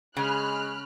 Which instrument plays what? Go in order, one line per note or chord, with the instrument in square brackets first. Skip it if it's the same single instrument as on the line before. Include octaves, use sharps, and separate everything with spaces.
[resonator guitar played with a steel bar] C#3 [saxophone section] G#3 [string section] B5 F6 F#6